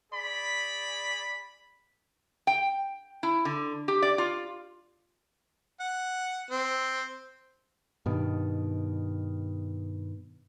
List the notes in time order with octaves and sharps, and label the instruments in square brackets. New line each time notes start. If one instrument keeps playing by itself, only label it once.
[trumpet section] G#4 D5 B5
[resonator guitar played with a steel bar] G5
E4
D3
G4
D5
F4
[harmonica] F#5
C4
[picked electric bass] G2 B2 D#3